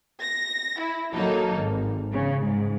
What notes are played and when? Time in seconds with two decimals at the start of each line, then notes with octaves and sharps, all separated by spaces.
0.22 A#6
0.81 E4
1.14 F#3 A#3 D#4 A4
1.55 G#1
2.12 C#3
2.44 G#2